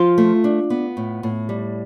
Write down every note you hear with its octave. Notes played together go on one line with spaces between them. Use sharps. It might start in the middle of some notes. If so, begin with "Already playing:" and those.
Already playing: F3 F4
A3
D4
B3
A2
A2
G3